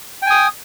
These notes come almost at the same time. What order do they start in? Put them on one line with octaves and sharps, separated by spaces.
G5 G#5 D#6